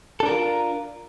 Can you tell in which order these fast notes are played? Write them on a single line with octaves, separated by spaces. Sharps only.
A4 D4 A#4 F#4 F4